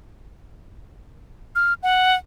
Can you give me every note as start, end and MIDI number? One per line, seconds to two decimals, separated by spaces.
1.55 1.74 89
1.83 2.16 78